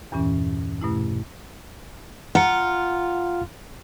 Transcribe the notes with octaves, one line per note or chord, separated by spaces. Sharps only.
E2 G2 A#2 E3 C#4
G2 B2 A3 E4
F4 F#5 A#5 C#7